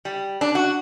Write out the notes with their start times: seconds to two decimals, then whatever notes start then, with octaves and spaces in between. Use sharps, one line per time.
0.05 G3
0.41 D4
0.55 F#4